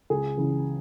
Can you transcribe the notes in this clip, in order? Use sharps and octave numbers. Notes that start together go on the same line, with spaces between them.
C#2 G#4
C#3 E3